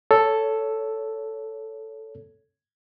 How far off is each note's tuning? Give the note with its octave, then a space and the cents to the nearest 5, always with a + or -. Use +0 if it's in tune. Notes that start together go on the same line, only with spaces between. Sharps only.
A4 +0 C#5 +15